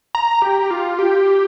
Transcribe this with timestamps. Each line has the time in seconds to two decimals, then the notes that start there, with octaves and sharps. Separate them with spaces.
0.15 A#5
0.42 G4
0.71 F4
0.99 G4